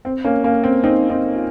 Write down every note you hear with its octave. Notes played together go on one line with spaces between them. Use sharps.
C4
A#3 C#4
A#3 C#4
C4
C4 D#4
C4 D#4
F4